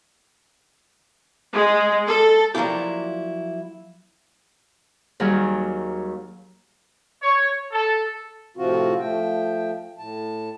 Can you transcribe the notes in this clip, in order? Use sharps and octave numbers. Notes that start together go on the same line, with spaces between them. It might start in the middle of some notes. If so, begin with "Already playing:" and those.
G#3
A4
F3 F#3 A#3 D4 E4 G4
D#2 D#3 F#3 G3 G#4
C#5
A4
A2 C3 F3 C4 F4 F#4
F3 A3 G5
A2 A5